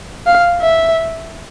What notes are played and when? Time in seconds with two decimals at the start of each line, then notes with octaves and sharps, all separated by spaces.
0.27 F5
0.61 E5